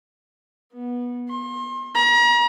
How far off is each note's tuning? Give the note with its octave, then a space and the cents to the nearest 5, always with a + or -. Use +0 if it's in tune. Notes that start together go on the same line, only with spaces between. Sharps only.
B3 -20
C6 +35
A#5 +40